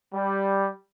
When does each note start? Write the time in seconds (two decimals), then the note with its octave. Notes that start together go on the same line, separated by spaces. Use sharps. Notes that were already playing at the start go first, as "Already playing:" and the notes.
0.14 G3